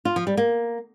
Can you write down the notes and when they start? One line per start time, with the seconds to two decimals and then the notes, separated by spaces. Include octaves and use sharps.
0.05 F4
0.16 F3
0.27 G3
0.37 A#3